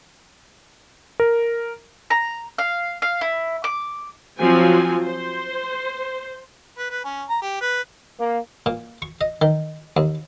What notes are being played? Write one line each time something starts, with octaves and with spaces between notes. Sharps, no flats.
A#4
A#5
F5
F5
E4
D6
F3 F#3 C4 F#4 G#5
C5
B4
B4
C#4
A#5
G4
B4
A#3
A#2
C#6
D#5
D#3
D#2